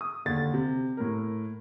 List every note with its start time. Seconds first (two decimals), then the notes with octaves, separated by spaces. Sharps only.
0.01 D#6
0.25 D#2 D3 A6
0.54 C3
0.97 A2 A#4